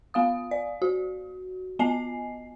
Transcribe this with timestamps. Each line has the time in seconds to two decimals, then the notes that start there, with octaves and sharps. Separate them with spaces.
0.14 B3 F5 D#6
0.51 D5
0.82 F#4
1.79 B3 D#5 G#5 C7